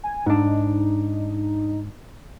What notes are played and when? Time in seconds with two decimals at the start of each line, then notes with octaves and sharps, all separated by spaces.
0.03 G#5
0.26 G#2 D4 D#4